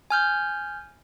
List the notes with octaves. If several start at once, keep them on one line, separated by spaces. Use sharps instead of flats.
G#5 F6 G6